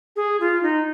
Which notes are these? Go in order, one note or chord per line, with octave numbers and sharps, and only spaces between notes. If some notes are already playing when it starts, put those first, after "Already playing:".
G#4
F4
D#4